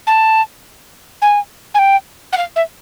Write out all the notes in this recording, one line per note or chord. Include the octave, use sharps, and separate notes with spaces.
A5
G#5
G#5
G5
F#5
F5
E5